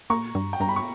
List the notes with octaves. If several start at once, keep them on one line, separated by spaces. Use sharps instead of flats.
A#2 A#5 C#6
G2
G5
G2 A#5
B5
C#6